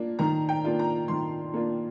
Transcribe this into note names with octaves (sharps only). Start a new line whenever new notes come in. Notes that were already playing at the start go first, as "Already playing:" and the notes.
Already playing: A#3 D4 F4
D#3 A#5
G5
A#3 D4 F4
A#5
D#3 C6
A#3 D4 F4